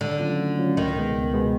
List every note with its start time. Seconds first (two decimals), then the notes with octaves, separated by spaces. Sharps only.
0.01 D3 D#3
0.20 F#3 A3 C#4 F4
0.39 D#3
0.58 F#3 A3 C#4 F4
0.77 C#2 D#3
0.96 B2 G#3 B3
1.15 C#2
1.34 B2 G#3 B3